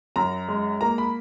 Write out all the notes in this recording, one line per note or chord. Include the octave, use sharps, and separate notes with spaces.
F#2 A#5
G#3
A#3 A#5
B5